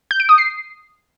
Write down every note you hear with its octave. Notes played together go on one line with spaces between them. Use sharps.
G6
D7
D#6
C7